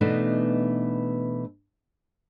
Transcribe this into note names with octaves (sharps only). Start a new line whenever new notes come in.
B2 E3 A3 B3 D4 D#4